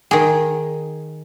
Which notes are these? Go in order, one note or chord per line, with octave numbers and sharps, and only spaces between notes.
D#3 G#4